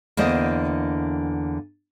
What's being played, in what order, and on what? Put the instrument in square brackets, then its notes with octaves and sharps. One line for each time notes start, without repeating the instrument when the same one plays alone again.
[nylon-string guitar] E2 D3 A#3 C5 D#5